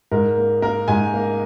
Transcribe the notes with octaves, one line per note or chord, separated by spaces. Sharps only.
G#2 A#4
A#3
A#3 A#4
G#2 G#5
A#3